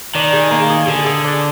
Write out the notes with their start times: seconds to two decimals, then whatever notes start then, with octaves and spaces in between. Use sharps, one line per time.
0.15 D#3 D4
0.33 G#4
0.51 A#3
0.70 G#4
0.87 D3 G#4
1.06 G#4
1.24 D4